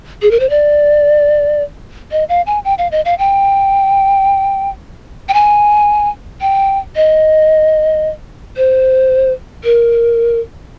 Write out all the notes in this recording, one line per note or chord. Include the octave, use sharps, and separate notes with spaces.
G#4
A#4
C5
D5
D#5
F5
G#5
G5
F5
D#5
F5
G5
G5
G#5
G5
D#5
C5
A#4